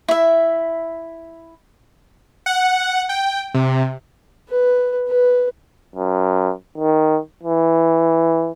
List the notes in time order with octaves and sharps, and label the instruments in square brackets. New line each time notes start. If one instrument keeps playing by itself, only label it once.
[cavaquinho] E4 E5
[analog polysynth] F#5
G5
C3
[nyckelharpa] B4
B4
[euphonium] F#2
D#3
E3